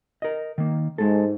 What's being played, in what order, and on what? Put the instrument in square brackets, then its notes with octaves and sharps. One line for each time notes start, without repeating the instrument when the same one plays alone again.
[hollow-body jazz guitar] A#4 D#5
D#3 A#3
[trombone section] G#2 [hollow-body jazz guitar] G#3 A4